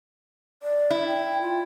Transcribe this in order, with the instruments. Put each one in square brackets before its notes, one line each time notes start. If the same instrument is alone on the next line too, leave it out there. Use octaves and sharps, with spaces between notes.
[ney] D5
[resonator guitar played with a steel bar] E4
[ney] G5
F4